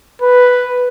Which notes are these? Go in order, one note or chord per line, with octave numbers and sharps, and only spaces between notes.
B4